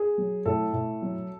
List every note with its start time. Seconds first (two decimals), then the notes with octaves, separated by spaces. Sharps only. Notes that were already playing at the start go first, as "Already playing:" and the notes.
Already playing: G#4
0.18 F#3
0.46 A2 A4
0.73 A2
1.02 F#3